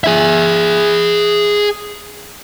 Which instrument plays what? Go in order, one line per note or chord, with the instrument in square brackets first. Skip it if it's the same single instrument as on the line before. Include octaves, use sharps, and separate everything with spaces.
[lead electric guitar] G#4 E5